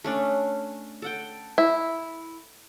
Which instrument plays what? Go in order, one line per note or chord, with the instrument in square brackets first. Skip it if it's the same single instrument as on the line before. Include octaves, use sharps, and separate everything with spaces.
[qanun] A3 C#4 D4
A4 F#5 G5
[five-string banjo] E4